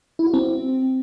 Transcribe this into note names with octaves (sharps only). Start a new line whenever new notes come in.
E4
F#4
C4